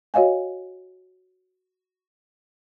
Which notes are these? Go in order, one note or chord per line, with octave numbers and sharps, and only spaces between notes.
F#4 C#5 D#5 F5 G#5